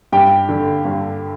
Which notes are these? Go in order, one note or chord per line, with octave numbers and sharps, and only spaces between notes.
G2 G4 G5
D3
G2